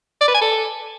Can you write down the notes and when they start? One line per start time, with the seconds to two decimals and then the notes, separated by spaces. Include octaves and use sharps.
0.21 D5
0.28 B4
0.35 G#5
0.41 A4